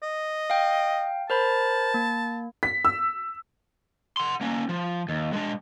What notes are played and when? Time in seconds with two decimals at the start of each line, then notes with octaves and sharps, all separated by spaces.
0.03 D#5
0.50 F5 G5
1.30 A#4 C5 A5 B5
1.94 A#3
2.63 B6
2.85 E6
4.17 F#5 C6
4.41 A#3 C#4
4.69 F3
5.09 D#2
5.33 G#3 D4